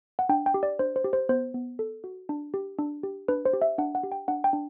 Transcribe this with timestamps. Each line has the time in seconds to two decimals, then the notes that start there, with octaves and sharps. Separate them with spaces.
0.19 F#5
0.29 D4 G5
0.46 G5
0.54 G4
0.63 D5
0.79 D4 C5
0.96 C5
1.04 G4
1.13 C5
1.29 B3 C5
1.54 B3
1.79 A4
2.04 F#4
2.29 D4
2.54 G4
2.79 D4
3.03 G4
3.28 D4 B4
3.45 C5
3.53 G4
3.62 E5
3.78 D4 F#5
3.95 F#5
4.03 G4
4.12 G5
4.28 D4 F#5
4.44 G5
4.53 D4